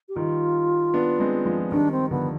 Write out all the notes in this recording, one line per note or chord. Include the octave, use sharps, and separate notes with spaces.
G4
D#3 G3 F4
B3 D4
G#3 C4
F3 G#3
D#3 G3 D4
C4
D3 F3 B3